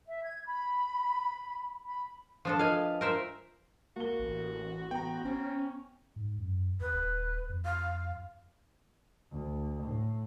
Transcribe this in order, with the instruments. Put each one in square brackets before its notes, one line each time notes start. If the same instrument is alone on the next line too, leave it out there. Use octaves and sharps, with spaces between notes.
[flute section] E5
G#6
B5
B5
[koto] F3 D4 A4
[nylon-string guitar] F4 B4 D#5 [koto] F5 G#5
[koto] A#4 C5 E5
[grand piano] A#3 G7 [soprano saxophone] F#4
[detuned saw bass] A1
[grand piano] B3 [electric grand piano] G5 A#5
[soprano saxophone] C4 [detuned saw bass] C#4
[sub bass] G#2
F#2
[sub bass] D#2 [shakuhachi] B4
[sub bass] D#1
F2
[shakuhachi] F5
[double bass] D2
A2